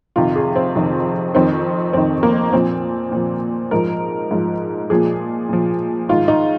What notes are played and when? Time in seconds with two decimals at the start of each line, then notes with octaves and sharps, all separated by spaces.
0.16 F2 C3 D#3 F4
0.36 G#4
0.55 C4
0.75 F2 C3 D#3
1.35 F2 D#3 C4
1.93 F2 D#3 C4
2.23 A#3
2.53 A#2 F3 C4
3.12 A#2 F3
3.71 G#2 F3 A#4
4.31 G#2 F3
4.90 A#2 F3 G#4
5.49 A#2 F3
6.09 G#2 D#3 F4
6.28 D#4